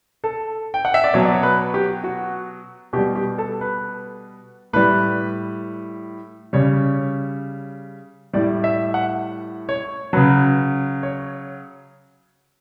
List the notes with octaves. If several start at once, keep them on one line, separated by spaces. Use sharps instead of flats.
A4
G5
F#5
E5
D5
B2 F#3 C#5
D5
C#5
B4
G4
F#4
B2 G3 G4
G4
A4
B4
A2 G3 B4
C#3 G3 C#5
A2 G3 D5
E5
F#5
C#5
C#3 F#3 B4
C#5